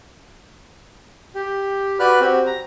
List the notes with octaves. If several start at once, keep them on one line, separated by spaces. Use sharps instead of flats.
G4
F#4 B4 D5 B5 F6 F#6
C4 F#4 G4
A#5